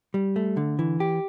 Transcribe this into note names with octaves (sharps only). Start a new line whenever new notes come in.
G3
A3
D3
E3
G4